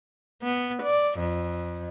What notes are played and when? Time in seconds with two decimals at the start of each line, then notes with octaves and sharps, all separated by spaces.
0.43 B3
0.83 D5
1.19 F2